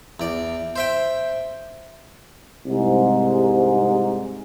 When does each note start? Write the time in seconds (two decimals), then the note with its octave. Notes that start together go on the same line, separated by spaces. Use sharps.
0.20 E2 D5
0.76 C5 E5 G5
2.66 C2 G#2